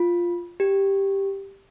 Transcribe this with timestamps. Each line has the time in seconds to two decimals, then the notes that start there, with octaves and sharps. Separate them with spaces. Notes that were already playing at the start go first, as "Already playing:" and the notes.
Already playing: F4
0.60 G4